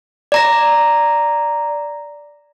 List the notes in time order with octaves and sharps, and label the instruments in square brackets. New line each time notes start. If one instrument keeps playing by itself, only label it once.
[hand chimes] D5 A#5 A#6